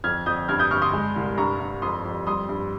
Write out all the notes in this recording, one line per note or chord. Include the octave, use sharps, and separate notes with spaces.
F2 F6 G#6
F2 D#6 G6
G2 F6 G#6
D#6 G6
G2 C#6 F6
C6 D#6
G#3
C2
G2 A#5 C#6
G2
F2 C6 D#6
F2
G3 C6 D#6
G2